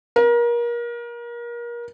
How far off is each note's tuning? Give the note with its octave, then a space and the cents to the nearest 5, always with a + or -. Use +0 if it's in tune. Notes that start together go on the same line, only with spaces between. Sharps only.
A#4 +30